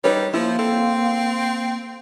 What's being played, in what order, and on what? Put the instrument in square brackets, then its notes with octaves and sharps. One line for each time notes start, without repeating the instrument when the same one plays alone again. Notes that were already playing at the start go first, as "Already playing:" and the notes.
[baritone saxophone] G3 [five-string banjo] D#4 B4 C#5
[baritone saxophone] F3 [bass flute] A#3 [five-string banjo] E4
[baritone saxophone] C4 [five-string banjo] A4